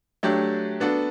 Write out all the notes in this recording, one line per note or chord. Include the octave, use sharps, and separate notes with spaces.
F#3 A3 D4 G4
B3 D4 F#4 A4